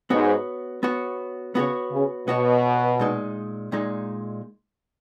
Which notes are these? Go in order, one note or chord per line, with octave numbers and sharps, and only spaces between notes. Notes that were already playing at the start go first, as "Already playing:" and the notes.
G#2 B3 F#4 C#5
B3 F#4 C#5
C#3 B3 F#4 C#5
C#3
B2 B3 F#4 C#5
A#2 G#3 D#4
A#2 G#3 D#4